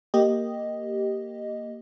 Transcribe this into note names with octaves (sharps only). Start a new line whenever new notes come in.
A#3 G4 D#5